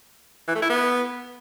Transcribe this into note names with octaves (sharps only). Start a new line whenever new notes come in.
E3
A3
E4
B3